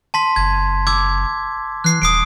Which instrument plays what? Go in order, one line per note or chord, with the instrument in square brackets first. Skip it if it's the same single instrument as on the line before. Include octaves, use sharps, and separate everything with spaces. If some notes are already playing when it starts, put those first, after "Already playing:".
[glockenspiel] A5 C6 B6
[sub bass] F#1 [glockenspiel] G#6
[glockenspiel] D6 E6 G#6
[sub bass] E3 [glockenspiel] F#6 C7
[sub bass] D#1 [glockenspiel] D#6 C7 D7